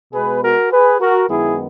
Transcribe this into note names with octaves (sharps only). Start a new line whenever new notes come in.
B2 G#3 B3 G#4 B4
F#4 A#4
G#4 B4
F#4 A#4
F#2 D#3 G#3 B3 E4 G#4